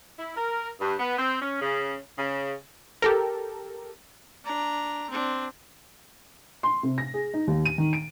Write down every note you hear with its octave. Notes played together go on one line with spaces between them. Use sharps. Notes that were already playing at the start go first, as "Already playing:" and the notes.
E4
A#4
G2
B3
C4
C#4
C#3
C#3
G4 A4 A#4
D4 A#5
C4 D4
C6
C3
A#6
G#4
D#4
D#2
D#7
D#3
D7